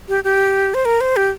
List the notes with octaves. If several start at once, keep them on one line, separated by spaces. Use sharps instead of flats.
G4
G4
C5
A#4
C5
G4